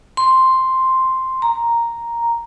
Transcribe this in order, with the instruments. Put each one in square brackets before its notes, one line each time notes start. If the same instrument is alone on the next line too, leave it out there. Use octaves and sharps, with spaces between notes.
[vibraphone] C6
A#5